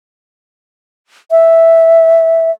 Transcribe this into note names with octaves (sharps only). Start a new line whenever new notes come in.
E5